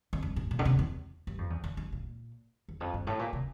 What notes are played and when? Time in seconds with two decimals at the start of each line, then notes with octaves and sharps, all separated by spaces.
0.13 F2
0.22 G2
0.36 A2
0.51 A#2
0.59 D3
0.65 C3
0.79 E2
1.27 G2
1.38 F2
1.50 E2
1.64 F2
1.77 G2
1.92 A#2
2.69 E2
2.80 F2
2.94 G2
3.07 A2
3.19 A#2
3.33 C3